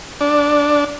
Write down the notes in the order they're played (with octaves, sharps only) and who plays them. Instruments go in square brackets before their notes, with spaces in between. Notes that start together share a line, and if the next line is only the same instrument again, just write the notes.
[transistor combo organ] D4